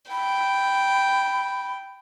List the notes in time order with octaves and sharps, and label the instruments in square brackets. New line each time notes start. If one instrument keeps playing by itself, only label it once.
[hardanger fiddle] G5 [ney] B5